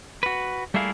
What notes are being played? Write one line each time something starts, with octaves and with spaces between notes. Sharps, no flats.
F#4 B4
G3 A3 A#3 E4 G#4 F5